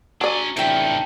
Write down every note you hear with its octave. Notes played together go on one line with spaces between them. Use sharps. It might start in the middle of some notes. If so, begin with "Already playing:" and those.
F#3 D4 D5 G#5
A1 C3 D#3 D4 E4 G4 A4